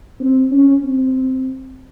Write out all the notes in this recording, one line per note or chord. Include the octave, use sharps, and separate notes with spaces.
C4
C#4
C4